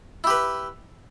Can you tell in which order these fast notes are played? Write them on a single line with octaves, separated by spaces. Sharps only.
E4 G4 B4